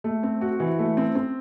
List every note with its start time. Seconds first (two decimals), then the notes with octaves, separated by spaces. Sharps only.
0.04 A3
0.23 C4
0.41 F#4
0.60 E3
0.79 A3
0.97 C4
1.15 C4